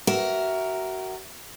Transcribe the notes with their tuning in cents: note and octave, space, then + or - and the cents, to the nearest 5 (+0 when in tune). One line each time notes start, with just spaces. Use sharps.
F#4 +30 A#4 +0 E5 +0